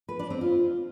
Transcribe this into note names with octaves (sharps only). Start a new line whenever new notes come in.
B4
D4
C4
F4